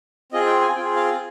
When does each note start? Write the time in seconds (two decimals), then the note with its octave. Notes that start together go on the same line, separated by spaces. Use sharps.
0.32 C4 F4 G#4 D#5
0.46 G5
0.61 G#5
0.75 C4 F4 G#4 G5
0.96 F5